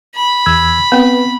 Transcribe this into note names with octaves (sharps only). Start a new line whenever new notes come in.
B5
E2 E6 G#6
B3 C4 B4